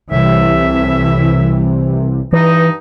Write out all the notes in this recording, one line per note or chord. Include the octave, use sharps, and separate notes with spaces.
C2 A2 C3 E3 E5
G2 E3 D#4